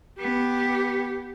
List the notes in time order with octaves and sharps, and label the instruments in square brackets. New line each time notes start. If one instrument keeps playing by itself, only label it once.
[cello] B3 [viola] G4